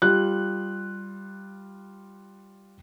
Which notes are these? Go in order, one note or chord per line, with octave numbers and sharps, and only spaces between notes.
G3 F4 F#6